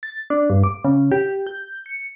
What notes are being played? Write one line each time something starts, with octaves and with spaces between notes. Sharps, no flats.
A6
D4
G2
D6
C#3
G4
G6
C#7